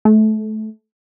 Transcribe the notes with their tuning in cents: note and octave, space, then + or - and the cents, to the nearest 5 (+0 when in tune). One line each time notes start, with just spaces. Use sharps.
A3 -25